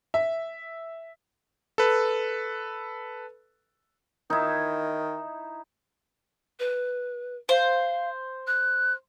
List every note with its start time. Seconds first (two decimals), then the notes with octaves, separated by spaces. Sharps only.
0.14 E5
1.78 A4 B4
4.30 D#3 D#4 E4
6.59 B4
7.49 C5 F5
8.47 F#6